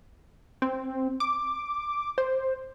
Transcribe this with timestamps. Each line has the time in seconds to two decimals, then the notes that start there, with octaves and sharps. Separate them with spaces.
0.62 C4
1.20 D6
2.18 C5